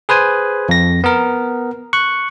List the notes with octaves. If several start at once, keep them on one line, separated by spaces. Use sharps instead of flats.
G#4 B4 C5 G#5
F2 A#6
B3 A#4
C#6 F#6